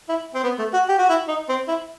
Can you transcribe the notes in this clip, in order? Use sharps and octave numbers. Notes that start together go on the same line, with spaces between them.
E4
C4
B3
A3
F#4
G4
F#4
E4
D#4
C4
E4